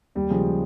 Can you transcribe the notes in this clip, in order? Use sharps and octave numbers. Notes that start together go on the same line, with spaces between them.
D#2 G3
C#3 F3 G#3